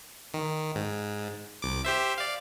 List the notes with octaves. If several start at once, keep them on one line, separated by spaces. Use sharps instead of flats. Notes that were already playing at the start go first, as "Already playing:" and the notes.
D#3
G#2
C2 D6
G4 C5 E5
D5 F5